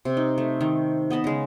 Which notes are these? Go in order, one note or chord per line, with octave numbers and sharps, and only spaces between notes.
C3
D#4
A3
D#3
B3 D#5 A5 B5
C#3 G#3